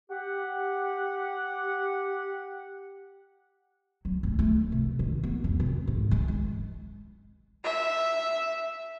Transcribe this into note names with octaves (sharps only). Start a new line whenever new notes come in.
G4 F#5
F#3
D2
A3
C3
D#3
B3
E2
C3
G#2
E3
G#3
E5